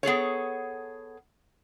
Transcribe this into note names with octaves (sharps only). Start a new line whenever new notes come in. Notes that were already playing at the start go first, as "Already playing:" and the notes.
B3 G#4 A4 C#5